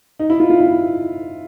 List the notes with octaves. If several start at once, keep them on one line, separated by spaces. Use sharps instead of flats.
D#4
E4
F4
F4
E4